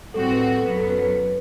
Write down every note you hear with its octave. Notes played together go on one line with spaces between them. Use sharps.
A2 G3 C4 F#4 A4
B4
A4
A4
F#2 F#3 B3 B4
A4
B4
B4